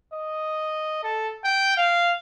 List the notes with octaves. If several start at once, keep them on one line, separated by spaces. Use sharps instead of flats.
D#5
A4
G5
F5